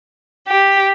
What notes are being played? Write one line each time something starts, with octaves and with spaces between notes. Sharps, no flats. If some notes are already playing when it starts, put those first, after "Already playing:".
G4